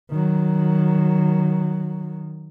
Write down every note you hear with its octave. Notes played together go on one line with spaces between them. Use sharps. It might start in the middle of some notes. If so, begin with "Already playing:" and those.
D#3 F#3